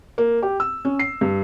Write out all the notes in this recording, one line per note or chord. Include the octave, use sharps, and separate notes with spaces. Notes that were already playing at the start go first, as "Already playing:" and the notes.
A#3
G4
E6
C#4
C7
G2